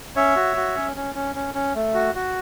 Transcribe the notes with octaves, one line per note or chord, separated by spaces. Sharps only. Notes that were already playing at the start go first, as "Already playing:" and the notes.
C#4 C#5 E5
F#4
F#4
C#4
C#4
C#4
C#4
C#4
A3
F#4
F#4